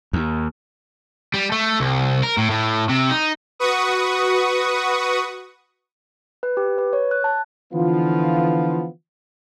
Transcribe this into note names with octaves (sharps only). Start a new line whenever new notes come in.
D#2
G3
A3
C2
A#4
A2
A2
C3
D#4
F#4 B4 C#6 D#6
B4
G4
B4
C#5
F#6
A5
D3 E3 F3 B3 F4